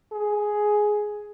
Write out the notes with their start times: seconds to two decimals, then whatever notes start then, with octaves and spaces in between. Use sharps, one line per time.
0.12 G#4